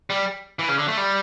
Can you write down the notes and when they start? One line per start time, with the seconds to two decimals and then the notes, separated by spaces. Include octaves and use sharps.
0.10 G3
0.59 E3
0.68 C#3
0.78 D3
0.88 A3
0.97 G3